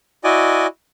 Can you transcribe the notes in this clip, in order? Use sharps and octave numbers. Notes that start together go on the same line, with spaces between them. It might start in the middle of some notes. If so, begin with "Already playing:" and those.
E4 F#4 D5 D#5 G#5